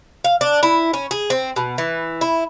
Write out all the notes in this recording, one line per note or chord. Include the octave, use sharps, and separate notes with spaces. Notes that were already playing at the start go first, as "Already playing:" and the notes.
F5
D4
E4
C#4
G#4
C4
B2
E3
E4